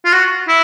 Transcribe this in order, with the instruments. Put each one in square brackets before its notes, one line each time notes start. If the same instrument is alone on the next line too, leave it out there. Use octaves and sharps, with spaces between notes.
[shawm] F4
F#4
E4